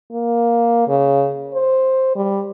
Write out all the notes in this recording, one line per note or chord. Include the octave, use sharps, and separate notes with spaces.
A#3
C#3
C5
G3